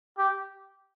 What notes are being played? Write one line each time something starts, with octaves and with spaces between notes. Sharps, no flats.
G4